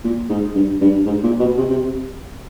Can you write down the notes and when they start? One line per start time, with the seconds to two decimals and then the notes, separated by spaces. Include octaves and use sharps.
0.04 A#2
0.29 G#2
0.55 G2
0.81 G2
1.06 G#2
1.23 A#2
1.40 B2
1.58 C3
1.70 C3